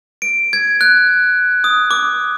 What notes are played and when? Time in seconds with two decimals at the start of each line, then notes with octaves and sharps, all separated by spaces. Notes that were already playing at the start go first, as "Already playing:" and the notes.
0.22 D7
0.53 G#6
0.81 F#6
1.64 D#6
1.91 D6